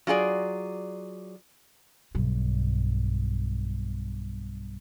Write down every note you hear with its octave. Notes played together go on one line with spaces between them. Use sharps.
F#3 F4 G#4 D5
B1 G2